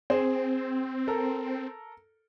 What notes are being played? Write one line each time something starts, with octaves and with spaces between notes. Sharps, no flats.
C4 G#4 C5
A4 A#4